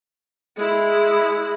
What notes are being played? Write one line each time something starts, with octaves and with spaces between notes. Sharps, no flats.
G#3 E4